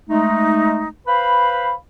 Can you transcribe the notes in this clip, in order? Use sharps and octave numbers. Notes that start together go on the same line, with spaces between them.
G#3 A3 D#4
B4 C5 F5 B5